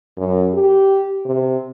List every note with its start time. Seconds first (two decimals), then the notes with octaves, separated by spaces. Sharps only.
0.17 F#2
0.54 G4
1.26 C3